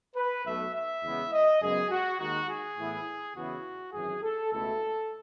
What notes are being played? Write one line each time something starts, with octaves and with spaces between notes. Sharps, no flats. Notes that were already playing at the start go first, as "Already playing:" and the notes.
B4
B1 B2 A3 E5
E5
E2 C#3 G#3 B3 E4
D#5
F#2 C#3 G#3 B3 G#4
F#4
D#2 D#3 G#3 D#4 F#4
G#4
A2 E3 B3 E4
E2 C#3 E3 B3 E4 F#4
G#1 F#2 E3 G#4
A4
C#2 B2 A3 E4 A4